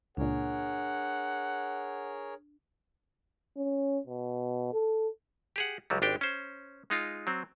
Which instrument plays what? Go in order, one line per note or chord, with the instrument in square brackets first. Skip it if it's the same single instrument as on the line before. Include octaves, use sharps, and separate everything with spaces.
[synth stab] C#2 A#2 [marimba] D4 [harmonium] G#4 A#4 C#5 [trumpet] F#5
[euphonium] C#4
B2
A4
[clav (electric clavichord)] G4 G#4 F#5
C#2 F#3 G3
G#1 D4 G4 G5
C#4 C5
G#3 D#4 F4
F#3 C4